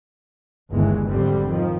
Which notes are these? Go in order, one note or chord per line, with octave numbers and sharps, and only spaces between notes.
G1 D#2 E3 G#3
G#1 F2 D3 G3 C4
D#3 F3